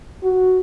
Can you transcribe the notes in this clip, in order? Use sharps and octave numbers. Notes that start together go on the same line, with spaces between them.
F#4